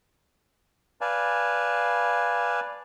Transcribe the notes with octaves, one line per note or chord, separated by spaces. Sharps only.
B4 D5 F5 G#5 A5